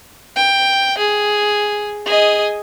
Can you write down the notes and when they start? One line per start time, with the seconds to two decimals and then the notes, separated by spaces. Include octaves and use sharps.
0.36 G5
0.98 G#4
2.06 G#4 D#5